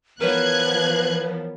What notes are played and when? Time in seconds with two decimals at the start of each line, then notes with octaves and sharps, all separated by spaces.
0.21 E3 F3 B3 A#4 B4 C#5 F#6 G#6